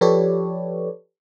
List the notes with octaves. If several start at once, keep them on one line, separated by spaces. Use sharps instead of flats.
F3 G4 A4 B4 C#5 D5